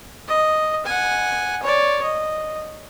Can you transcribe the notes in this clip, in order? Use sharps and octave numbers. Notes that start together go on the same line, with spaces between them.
D#5
F#5 G#5
C#5 D5
D#5